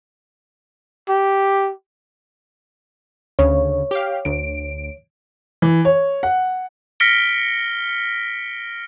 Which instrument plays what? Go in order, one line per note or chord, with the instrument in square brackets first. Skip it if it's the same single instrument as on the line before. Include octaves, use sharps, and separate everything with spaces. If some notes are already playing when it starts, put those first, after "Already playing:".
[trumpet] G4
[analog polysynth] D2 C#3 [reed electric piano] C#5
[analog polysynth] G4 F5
D2 D7
[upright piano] E3
C#5
F#5
[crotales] F6 A#6 B6 C#7 D7 G7